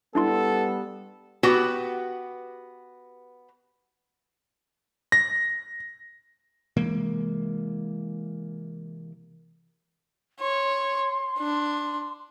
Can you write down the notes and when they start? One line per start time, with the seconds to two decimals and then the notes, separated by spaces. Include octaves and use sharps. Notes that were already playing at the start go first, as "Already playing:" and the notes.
0.15 G3 B3 D4 E4 A4 C6
1.43 B3 F#4 G4 B4
5.12 A#6
6.77 C3 E3 G#3 A#3
10.41 C#5 C6
11.38 D4